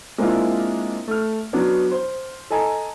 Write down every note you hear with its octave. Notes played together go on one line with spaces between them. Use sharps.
G#3 A#3 C4 D4 E4 F4
A3 F6
F#3 B3 D4
C5
A4 D#5 G#5 A#5